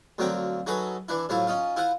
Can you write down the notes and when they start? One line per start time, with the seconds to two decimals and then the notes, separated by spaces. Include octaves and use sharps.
0.18 D2 F3 F#3 C4 A#4 G5
0.67 F#3 D#4 F#4 G#4 A4 B4
1.08 E3 D4 E4
1.29 A2 F3 F#3 E4 F4
1.47 C#4 D#4 F4
1.76 E4 F4 C5 F#5